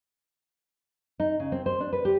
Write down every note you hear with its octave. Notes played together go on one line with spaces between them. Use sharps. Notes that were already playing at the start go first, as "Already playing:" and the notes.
D#4
C#3
C4
C5
D4
B4
G4